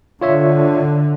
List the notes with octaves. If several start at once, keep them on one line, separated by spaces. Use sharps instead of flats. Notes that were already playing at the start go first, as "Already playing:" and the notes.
D3 F4 C#5 E5